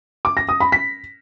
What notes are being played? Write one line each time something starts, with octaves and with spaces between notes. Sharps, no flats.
D6
A#6
D#6
B5
B6